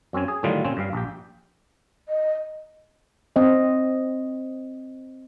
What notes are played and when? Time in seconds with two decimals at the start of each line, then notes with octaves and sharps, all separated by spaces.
0.13 F#2 C4 C#4 G#5
0.28 G#4
0.43 A2 D3 D#3 F#3 G3 F4
0.64 A#2 C4 C#4
0.77 G2 G3 F5
0.93 A#1 G4
2.09 D#5
3.36 C4 D#5